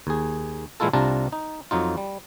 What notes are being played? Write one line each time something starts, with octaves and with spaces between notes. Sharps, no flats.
D#2 G#4
A#2 E3 G#3 E4 F4 A4
C2 C3 D4 F4 A5 A#5
D#4
F2 F#3 D#4 F4
G3